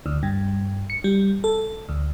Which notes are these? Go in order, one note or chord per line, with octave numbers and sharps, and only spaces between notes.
D2
G2
C#7
G3
A4
D2